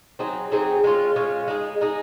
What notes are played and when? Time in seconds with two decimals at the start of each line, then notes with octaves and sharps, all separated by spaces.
0.19 F#3 C4 D#4 G#4
0.52 F#3 C4 D#4 G#4
0.84 G#3 C#4 F4
1.16 G#3 C#4 F4
1.48 G#3 D#4 G#4
1.81 G#3 D#4 G#4